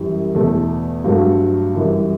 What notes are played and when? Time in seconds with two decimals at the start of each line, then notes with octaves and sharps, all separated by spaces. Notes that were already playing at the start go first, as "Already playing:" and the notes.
Already playing: F#2 E3 G3 G4
0.35 E2 B2 A3
1.04 G2 F#3 A3 F#4
1.75 F#2 E3 G3